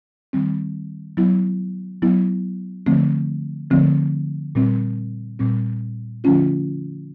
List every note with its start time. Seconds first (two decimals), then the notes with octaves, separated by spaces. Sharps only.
0.33 D#3 G3 C4
1.17 F#3 B3 E4
2.02 F#3 B3 E4
2.86 D3 F3 A3 C4
3.70 D3 F3 A3 C4
4.55 A#2 G3 C4
5.39 A#2 G3 C4
6.24 D3 F3 A3 C#4 F4